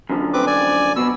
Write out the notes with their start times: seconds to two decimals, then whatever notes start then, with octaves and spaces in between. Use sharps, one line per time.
0.10 F#2 D3 F3
0.33 C4 B4 D6
0.47 D5 G#5
0.96 B2 B3 E6